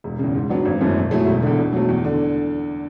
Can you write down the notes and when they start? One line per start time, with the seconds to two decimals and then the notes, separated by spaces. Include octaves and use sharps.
0.04 E1
0.19 E2 C#3
0.35 G#2
0.49 F#3 B3 D4
0.65 G#1
0.81 F#2 E3 A3
0.96 B2
1.11 F#3 A3 E4 G#4
1.27 E1
1.42 E2 D3
1.58 B2
1.73 F#3 A3
1.88 E2
2.05 D3